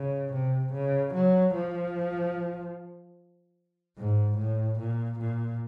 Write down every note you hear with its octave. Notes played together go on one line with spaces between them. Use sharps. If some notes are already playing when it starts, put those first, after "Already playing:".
Already playing: C#3
C3
C#3
F#3
F3
G#2
A2
A#2
A#2